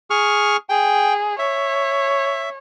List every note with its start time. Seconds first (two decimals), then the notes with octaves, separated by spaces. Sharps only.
0.10 G#4 C#6 F6
0.69 G#4 G5
1.39 C#5 E5